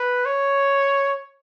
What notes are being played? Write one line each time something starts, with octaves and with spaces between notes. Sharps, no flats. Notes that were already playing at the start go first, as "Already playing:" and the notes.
Already playing: B4
C#5